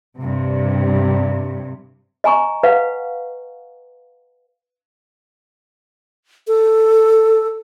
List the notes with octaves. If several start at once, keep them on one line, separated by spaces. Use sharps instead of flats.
G2 C3
D#5 G#5 A#5 C#6
B4 F5 F#5
A4